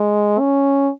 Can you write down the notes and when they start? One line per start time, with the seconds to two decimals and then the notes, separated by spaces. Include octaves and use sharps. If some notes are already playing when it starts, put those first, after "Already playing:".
Already playing: G#3
0.39 C#4